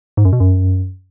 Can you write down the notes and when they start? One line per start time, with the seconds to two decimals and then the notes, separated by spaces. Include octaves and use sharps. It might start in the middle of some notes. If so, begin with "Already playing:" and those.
0.17 G#2
0.25 F#2
0.33 B2
0.40 F#2